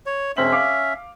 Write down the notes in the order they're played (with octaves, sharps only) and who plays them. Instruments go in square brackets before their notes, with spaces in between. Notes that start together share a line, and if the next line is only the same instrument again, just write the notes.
[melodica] C#5
[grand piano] E1 C4 F#7 [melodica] C#4 E5
[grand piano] F5 D6